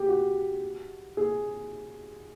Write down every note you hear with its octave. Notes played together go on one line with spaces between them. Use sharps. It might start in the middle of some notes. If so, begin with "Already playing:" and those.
Already playing: G4 G#4
F#4
G#4